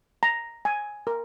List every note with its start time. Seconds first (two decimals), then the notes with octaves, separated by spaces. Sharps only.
0.23 A#5
0.65 G#5
1.07 A#4